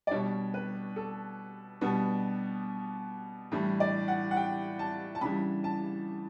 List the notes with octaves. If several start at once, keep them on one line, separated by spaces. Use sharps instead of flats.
D5
B2 G3 D4 C#5
B4
A4
B2 G3 B3 D4
A2 E3 G3 D4
D5
F#5
F#5
G5
A5
A5
C#3 E3 G3 D4 B5
A5